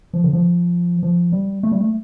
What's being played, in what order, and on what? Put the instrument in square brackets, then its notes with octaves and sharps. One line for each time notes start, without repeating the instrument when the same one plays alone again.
[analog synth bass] F3
D3
F3
F3
G3
A3
G3
A3